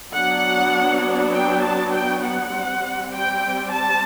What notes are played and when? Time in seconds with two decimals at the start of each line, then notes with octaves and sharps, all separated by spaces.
0.12 F#3 B3 D4 F#5
1.33 G5
1.62 A5
1.92 G5
2.23 F#5
2.53 G3 C4
3.12 G5
3.72 A5